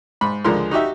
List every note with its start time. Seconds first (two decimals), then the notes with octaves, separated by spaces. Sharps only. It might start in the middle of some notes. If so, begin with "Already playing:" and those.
0.21 G#2 B5
0.44 C#2 D3 F3 G#3 A#4 C6
0.71 D#4 F#4 G4 E5